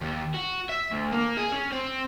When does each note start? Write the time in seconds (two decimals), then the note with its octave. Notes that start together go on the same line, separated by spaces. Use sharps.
0.01 D#2
0.34 F#4
0.69 E5
0.91 D2
1.12 A#3
1.37 G#4
1.52 C#4
1.72 C4